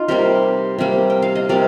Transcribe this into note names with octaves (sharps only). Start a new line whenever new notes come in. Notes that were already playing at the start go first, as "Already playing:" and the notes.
Already playing: D#4 F4
C3 G3 A#3 G4 A#4
C3 G3 A#3
G5
F5
D#5
C3 G3 A#4 D5